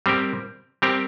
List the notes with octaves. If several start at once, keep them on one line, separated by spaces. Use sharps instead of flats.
G3 C4 G4 A#4
G3 C4 G4 A#4